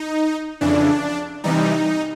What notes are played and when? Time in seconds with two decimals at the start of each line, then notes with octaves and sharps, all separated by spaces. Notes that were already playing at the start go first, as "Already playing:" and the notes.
Already playing: D#4
0.61 F2 C#3 E3 D4
1.44 C3 E3 G3 D#4